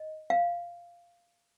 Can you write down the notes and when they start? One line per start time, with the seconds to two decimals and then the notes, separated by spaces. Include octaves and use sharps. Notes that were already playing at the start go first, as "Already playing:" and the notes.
Already playing: D#5
0.30 F5